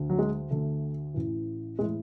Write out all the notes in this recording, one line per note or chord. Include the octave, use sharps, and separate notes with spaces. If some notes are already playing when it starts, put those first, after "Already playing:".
Already playing: D2 D3
F#3
G#3
D2 D3 A3
A1 A2 E3
A2 E3 G#3